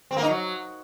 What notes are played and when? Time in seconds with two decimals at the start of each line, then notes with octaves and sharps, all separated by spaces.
0.11 C4
0.17 A#3
0.23 D#4
0.28 F#3